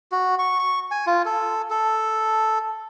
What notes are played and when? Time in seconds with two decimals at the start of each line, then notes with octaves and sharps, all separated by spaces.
0.12 F#4
0.39 C#6
0.59 C#6
0.91 G#5
1.07 F4
1.25 A4
1.70 A4